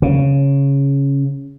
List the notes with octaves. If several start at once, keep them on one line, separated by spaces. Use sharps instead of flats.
C#3